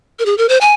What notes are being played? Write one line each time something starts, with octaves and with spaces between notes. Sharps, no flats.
A#4
G#4
A#4
C5
G#5